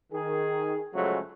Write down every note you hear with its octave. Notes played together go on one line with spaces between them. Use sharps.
D#3 G#4
F2 C#3 F#3 G#3 A3 C4